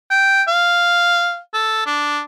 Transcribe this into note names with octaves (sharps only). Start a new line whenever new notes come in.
G5
F5
A4
D4